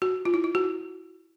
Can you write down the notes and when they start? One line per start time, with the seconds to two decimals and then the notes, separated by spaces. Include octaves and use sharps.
0.02 F#4
0.25 F4
0.34 E4
0.44 E4
0.55 F#4